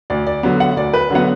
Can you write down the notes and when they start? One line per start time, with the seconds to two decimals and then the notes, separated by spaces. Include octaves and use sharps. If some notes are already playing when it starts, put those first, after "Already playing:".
0.10 D2 D5
0.27 D5
0.43 D3 F#3 B3
0.60 F#5
0.76 D2 D5
0.94 B4
1.11 D3 F#3 B3 F#5